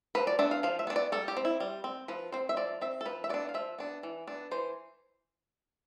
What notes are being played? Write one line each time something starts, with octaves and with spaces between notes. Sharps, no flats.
F3 B4
D5
B3 D4 E5
F5
F3 F5
E5
B3 D4
D5
G3 A4
G4
C4
E4
G3
C4
F3 B4
C4 C5
E5
F3 D5
C4 E5
A4
F3 B4
E5
B3 D4 D5
F5
F3 E5
B3 D4
E3
B3 D4
E3 C5